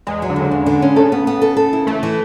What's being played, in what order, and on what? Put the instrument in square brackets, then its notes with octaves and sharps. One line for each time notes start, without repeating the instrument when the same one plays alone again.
[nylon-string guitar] E2 [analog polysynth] G#3
[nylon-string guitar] F#3
[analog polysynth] D3
[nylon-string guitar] E2 [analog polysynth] C#3
[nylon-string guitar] E2
D3
C#4
[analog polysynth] C#3 [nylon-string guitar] A4
[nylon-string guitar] B3
B3
A4
A4
E4
[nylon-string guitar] E3 [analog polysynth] A3
[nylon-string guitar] E3